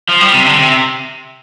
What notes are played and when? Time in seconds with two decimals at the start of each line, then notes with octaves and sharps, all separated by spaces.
0.09 F3
0.21 G3
0.33 C3
0.46 D3
0.59 C3